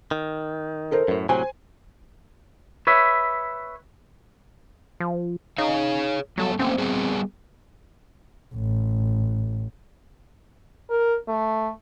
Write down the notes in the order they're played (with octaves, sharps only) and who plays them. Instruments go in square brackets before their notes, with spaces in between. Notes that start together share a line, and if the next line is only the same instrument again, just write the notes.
[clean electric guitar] D#3
[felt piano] A4 A#4 C5
[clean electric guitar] F#2 A2
[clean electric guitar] A2 C3 F#3 [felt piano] C5 G#5
[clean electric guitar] B4 C#5 E5
[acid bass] F3
[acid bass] D#4 [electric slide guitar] G#4 C#5 F5
[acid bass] F#3 [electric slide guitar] G3 B3 A4
[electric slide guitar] A3 A#3 C#4 [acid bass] C4
[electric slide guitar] G3 B3 G#4
[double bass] A1
[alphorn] A#4
A3